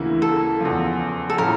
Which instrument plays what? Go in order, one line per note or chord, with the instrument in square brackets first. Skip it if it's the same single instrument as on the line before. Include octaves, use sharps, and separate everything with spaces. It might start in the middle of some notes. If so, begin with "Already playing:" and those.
Already playing: [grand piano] D2 C#3 E3 A#3 E4
[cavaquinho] A4
[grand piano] E2 C#3 F3
[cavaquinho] A4
[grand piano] A2 F3 C#4 E4 [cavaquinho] A#4